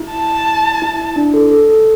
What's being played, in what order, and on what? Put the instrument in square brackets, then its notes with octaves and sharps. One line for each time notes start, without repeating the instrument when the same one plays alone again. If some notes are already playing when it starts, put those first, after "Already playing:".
Already playing: [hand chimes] E4
[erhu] A5
[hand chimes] E4
E4
D4
A4
A4
A4